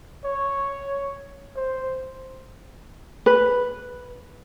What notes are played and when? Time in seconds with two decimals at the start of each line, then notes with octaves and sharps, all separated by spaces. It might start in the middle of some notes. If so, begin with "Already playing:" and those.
0.25 C#5
1.56 C5
3.26 B4